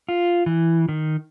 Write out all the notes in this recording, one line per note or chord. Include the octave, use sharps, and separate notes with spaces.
F4
E3
D#3